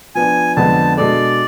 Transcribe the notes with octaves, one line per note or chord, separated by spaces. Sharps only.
F3 B3 D4 G#5
F2 D3 G#3 B3 A5
B2 G#3 D4 A4 D5